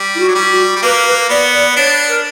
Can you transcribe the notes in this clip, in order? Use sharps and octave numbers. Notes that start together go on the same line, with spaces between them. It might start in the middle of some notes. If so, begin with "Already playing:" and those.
Already playing: G3
E4
F#4
F#3
G3
F#4
G3
A#3 B4
B4
B3 D5
D5
D4 C#5
A#4